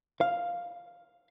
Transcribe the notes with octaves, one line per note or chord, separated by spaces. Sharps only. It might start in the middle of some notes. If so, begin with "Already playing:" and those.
F5